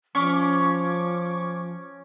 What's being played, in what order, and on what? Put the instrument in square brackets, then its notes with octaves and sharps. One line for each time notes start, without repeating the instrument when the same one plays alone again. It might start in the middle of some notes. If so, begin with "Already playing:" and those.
[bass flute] F3 [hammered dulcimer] C#4 [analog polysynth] C#6 D6